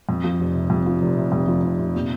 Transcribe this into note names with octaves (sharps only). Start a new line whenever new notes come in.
F2
F3
F1
C3
F2
F3
F1
C3
F2
F3
F1
C3
A#2